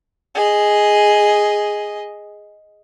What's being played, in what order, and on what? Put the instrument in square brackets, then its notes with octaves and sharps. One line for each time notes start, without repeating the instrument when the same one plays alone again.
[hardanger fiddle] G#4 D#5